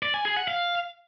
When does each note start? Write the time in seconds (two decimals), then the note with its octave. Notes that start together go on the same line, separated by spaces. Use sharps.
0.03 D5
0.14 G#5
0.25 G#4
0.36 F#5
0.48 F5